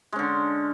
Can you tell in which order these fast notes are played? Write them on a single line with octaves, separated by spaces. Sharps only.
G#3 C#4 D3